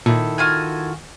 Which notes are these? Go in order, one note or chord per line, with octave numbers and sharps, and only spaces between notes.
A#2 D#3 E4 A4
F4 F#4 G#5